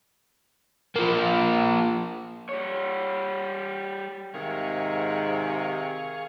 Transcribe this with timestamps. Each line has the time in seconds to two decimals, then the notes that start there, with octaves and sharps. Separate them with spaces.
0.96 F3 A#3
2.49 G3 C#5
4.34 G#2 C3 D#3 G#4 F5 C#6